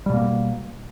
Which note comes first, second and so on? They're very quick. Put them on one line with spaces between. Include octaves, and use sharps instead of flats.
G3 B2 A#3